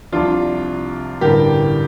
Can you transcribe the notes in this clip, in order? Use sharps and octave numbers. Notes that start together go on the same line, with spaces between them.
C2 C3 F3 D4 F4
A1 G2 D3 G3 G4 A#4